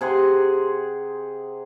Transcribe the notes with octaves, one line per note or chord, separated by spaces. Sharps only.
C3 G#4 F#5 C6